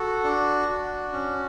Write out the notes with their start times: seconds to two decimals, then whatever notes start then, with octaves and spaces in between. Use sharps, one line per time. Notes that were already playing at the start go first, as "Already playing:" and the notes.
Already playing: F#4 A4
0.24 D4
0.68 F#4
1.13 C#4